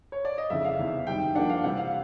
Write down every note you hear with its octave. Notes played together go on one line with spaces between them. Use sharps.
C#5
D5
D#5
F2 C#3 E3 E5
F5
E2 C3 E3
F#2 D#3 G3 G5
F3 A#3 D4 F#5
F5
C3 E3 G3 F#5
F5